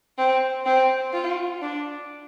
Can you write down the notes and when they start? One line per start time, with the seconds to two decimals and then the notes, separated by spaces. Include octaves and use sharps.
0.18 C4
0.66 C4
1.13 F4
1.62 D4